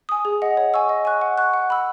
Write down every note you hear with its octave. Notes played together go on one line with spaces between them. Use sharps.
G#5 D#6
G#4
D#5 F#5
C#5
G#5 C#6 E6
D#5
G#5 C#6 F#6
F#5
C#6 F#6
F#5
B5 E6